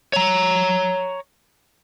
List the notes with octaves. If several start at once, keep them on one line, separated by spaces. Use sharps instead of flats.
C#5 A#5